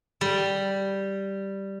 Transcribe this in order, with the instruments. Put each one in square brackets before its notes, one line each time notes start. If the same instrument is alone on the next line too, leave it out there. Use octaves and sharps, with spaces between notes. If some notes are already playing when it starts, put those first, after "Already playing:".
[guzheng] G3